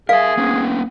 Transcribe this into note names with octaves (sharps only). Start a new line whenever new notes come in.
G#4 A#4 E5 F5
A#3 B3 C#4